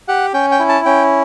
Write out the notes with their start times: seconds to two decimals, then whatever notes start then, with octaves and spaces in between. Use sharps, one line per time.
0.08 G4 F#5
0.34 C#4 G5
0.51 G5
0.60 E4
0.69 A5
0.85 C#4 G5